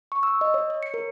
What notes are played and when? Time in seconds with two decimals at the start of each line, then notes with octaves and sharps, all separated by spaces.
0.12 C#6
0.23 E6
0.41 D#5
0.54 C#5
0.70 C#5
0.83 C#7
0.94 A#4